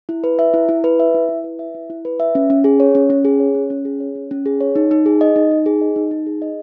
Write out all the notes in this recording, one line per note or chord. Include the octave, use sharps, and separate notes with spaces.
E4
B4
E5
E4
E4
B4
E5
E4
E4
B4
E5
E4
E4
B4
E5
C#4
C#4
G#4
C#5
C#4
C#4
G#4
C#5
C#4
C#4
G#4
C#5
C#4
C#4
G#4
C#5
D#4
D#4
G#4
D#5
D#4
D#4
G#4
D#5
D#4
D#4
G#4
D#5